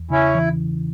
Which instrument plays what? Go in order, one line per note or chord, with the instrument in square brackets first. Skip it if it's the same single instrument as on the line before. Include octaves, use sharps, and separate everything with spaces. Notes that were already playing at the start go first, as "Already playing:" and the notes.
Already playing: [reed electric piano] E2
[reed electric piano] C#3 [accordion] C#4 E4
[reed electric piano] E3